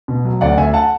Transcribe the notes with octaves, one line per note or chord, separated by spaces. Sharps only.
B2
F#3
D2 D5 F#5
D2 E5 G#5
F#5 A5